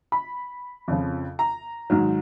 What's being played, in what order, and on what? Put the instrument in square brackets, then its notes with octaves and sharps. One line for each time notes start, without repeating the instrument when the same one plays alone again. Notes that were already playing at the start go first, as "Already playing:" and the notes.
[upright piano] B5
F2 C#3 F3
A#5
G#2 D#3 F#3